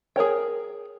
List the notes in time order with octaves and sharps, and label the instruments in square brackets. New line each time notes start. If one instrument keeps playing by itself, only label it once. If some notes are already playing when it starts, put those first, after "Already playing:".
[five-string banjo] G#4 A#4 C#5 G5